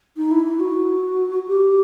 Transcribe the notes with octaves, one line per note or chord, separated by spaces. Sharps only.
D#4
E4
E4
F#4
G4